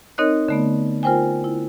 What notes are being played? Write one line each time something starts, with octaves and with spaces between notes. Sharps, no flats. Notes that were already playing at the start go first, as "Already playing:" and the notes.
C4 D#4 A#4 C#5 D#5 F#6
D3 A3 B3
F4 A#4 C5 G5 G#5
E4